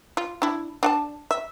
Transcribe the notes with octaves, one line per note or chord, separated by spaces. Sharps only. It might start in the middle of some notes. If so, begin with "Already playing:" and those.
F4
D4 E4
D4 F#5 A5
E5